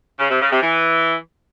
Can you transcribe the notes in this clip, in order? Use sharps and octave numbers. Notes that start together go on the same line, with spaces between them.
C#3
C3
C#3
C3
E3